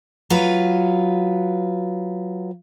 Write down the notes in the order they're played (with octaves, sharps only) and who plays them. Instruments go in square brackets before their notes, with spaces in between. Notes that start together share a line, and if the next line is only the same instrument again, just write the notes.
[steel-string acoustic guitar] F#3 F4 B4